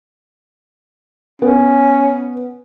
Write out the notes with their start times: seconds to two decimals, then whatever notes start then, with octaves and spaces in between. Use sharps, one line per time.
1.42 B3 C#4